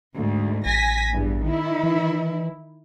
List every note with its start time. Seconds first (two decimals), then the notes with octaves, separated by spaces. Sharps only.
0.15 D2 G#2
0.66 A1 G#5 A#6 B6
1.13 E2 G2
1.44 D#3 E4
1.83 E3